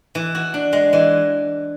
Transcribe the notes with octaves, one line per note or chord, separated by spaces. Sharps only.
E3
F#4
D4
G#3
E3